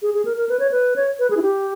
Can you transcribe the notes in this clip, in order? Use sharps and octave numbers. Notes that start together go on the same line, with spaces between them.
G#4
G#4
A#4
A#4
B4
C#5
B4
C#5
B4
G#4
E4
G4